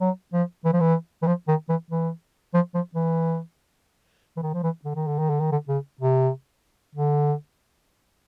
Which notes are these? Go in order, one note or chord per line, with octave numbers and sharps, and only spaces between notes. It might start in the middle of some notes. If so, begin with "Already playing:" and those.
F#3
F3
E3
F3
E3
E3
F3
D#3
E3
E3
F3
F3
E3
E3
D#3
F3
E3
D3
D#3
D3
D#3
D3
D#3
D3
C#3
C3
D3